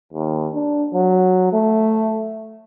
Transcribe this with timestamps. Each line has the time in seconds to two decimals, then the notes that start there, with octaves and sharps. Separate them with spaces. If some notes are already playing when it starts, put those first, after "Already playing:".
0.13 D#2
0.53 D4
0.93 F#3
1.53 A3